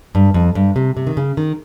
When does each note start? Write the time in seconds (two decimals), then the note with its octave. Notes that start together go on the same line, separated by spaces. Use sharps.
0.15 G2
0.34 F2
0.55 G2
0.76 C3
0.97 C3
1.07 D#3
1.17 C#3
1.37 D#3